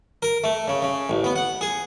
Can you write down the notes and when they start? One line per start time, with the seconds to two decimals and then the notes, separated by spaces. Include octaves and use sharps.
0.22 A#4
0.44 A3
0.68 C#3
0.82 C#3
1.09 A1
1.24 B3
1.36 F#5
1.61 G#4